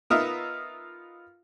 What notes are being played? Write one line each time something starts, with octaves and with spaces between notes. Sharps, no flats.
B3 D#4 F4 A#4 D#5 E5